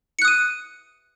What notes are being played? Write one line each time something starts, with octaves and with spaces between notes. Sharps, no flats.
D#6 F#6 C#7 D#7